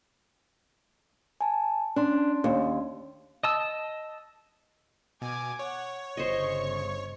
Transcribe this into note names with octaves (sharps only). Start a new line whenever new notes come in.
G#5 A5
C#4 D4 C6
D#2
D#5 A5 E6
B2 G#5 D6
C#5 F#5
G1 C#3 C5 D#5 C#6